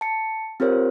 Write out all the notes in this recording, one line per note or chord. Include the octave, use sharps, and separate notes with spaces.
A5 C#7
C4 F4 G4 A#4 C5 C#5